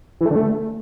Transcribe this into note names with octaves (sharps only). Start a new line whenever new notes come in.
E3
A3
D3
A3